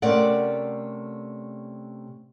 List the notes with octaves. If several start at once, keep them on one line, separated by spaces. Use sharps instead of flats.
C3 A3 C#4 A#4 D5 F#5